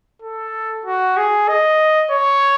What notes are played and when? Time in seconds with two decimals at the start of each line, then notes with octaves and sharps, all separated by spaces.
0.22 A4
0.86 F#4
1.17 G#4
1.49 D#5
2.11 C#5